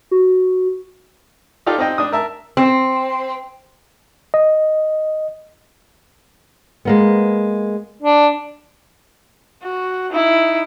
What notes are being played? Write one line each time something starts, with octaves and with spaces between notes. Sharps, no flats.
F#4
D#4 F4 G4 A4 D5 F5
C4 D#4 D#5 G5
D4 D#6
A#4 E5 A5
C4
D#5
G#3 A#3 B3
D4
F#4
D#4 E4